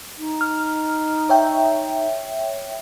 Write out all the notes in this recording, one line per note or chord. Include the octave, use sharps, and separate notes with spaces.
D#4
F6
C#5 E5 G5